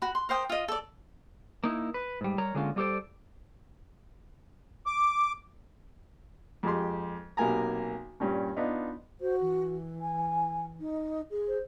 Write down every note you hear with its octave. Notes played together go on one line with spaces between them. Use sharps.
F#4 B5
C6
A#4 C5 G5 D#6
F4 D#5
A4 D5
A#3 D#4 E4
B4
G#2 G3
G3 A#4 C#5 A#5
D3 G#3 A#3 C#4 F4
G3 A3 G4 A4 C5 D5
D6
F2 G#3 G4 C6
B1 C3 A#3 G#5 A#5
G2 A#2 C#4
B3 D4 D#4 F4
F#4 C5
E3
G#5
D#4
G#4
C5